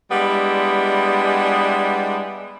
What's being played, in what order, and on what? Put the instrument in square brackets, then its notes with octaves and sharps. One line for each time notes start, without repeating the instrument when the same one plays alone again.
[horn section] G3 G#3 B3 D4 E4